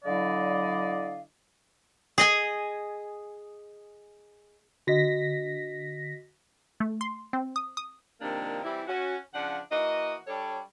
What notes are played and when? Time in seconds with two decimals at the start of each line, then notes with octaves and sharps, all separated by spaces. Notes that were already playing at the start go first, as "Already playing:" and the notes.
0.05 D3 F#3 E4 D5 D#5 F5
2.18 G#4 D#5 G#5
4.87 D3 F#4 D#5 A#6 B6
6.80 A3
7.01 C6
7.33 C4
7.56 D#6
7.77 D#6
8.21 C3 D#3 F3 G3 A#3 D4
8.63 E3 G3 C4 E4
8.88 C#4 F#4
9.34 C#3 F3 D4 F#5
9.71 E3 A#3 F#4 D#5
10.27 G3 D4 A4 C#5